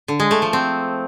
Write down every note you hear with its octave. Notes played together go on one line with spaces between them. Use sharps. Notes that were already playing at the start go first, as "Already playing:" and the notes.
D3
G#3
A3
F3
C4